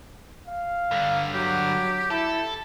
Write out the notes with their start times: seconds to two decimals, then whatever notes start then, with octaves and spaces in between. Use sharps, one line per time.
0.48 F5
0.91 G2 D3
1.33 F#3 G4
2.11 E4 A4